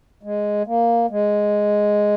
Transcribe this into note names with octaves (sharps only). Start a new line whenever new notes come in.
G#3
A#3
G#3